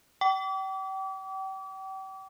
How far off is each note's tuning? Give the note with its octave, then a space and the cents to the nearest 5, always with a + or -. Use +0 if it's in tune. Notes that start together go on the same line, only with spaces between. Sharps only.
G5 -35 D6 -35